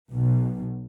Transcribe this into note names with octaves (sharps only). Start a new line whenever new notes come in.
B1 B2